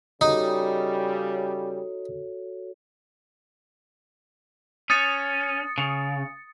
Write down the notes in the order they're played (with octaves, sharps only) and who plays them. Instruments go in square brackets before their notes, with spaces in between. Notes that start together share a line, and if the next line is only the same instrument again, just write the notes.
[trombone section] C#3 G3 [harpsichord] D#4 [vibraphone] F#4 A4 C#5
[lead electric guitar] C#4 [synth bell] D#6 A6 C#7
[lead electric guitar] C#3